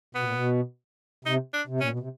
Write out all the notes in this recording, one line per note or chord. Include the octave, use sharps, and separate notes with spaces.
B2 B3
A#2
B2
C3 D#4
D4
C3
A#2 C#4
B2
C3